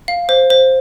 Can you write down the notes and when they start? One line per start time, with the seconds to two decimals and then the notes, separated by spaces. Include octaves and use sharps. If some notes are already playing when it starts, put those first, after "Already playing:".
0.08 F5
0.29 C5
0.50 C5